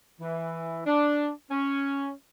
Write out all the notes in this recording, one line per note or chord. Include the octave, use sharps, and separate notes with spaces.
E3
D4
C#4